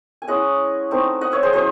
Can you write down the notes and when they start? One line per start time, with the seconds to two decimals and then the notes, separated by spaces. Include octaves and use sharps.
0.22 G#5
0.27 G#3 C#4 E4 D#5 F#5
0.91 A3 C4 D#4
1.21 D#5 F#5
1.32 C#5 E5
1.43 G#4 C5
1.53 F#3 C#4 E4 C5 D#5